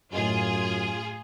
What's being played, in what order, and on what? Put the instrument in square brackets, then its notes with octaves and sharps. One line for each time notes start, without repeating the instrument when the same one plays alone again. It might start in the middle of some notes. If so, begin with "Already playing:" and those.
[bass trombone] F#2 [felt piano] A2 D#5 [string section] F4 G#4